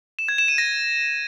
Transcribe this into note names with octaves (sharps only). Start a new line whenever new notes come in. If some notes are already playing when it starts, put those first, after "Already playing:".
E7
G#6
E7
D#7
A#6